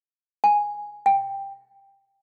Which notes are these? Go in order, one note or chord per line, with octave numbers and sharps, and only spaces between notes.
G#5
G5